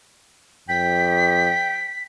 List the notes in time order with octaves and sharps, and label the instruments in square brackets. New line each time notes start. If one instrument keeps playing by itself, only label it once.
[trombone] F2 [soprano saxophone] G5 [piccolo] B6